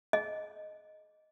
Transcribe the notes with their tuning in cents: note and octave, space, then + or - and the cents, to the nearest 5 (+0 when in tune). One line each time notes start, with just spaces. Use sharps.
G#4 +35 D#5 +0